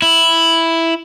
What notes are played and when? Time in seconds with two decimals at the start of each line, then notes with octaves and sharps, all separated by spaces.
0.02 E4